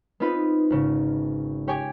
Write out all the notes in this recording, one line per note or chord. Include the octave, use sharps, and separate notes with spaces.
B3 C4 D#4 F4 B4 B5
G#1 C#3
G4 C#5 G5 G#5 D6